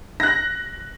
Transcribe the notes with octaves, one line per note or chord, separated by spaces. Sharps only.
F#6 A#6